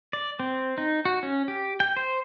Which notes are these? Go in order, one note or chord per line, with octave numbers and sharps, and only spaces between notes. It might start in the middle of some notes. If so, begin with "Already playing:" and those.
D5
C4
D#4
F#4
C#4
G4
G5
C5